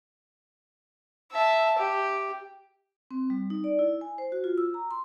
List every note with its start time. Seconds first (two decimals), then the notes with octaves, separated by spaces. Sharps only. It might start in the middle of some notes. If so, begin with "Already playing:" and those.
1.32 E5 A5
1.78 G4
3.11 C4
3.30 G3
3.50 D#4
3.64 D5
3.79 E4
4.01 G#5
4.18 C5
4.32 F#4
4.44 F4
4.58 E6
4.74 A#5
4.91 C6